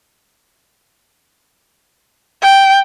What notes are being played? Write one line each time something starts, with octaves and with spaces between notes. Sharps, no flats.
G5